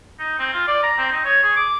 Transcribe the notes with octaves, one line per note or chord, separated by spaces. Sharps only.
D#4
C4
F4
D5
A#5
C4
D#4
C#5
G#4
D6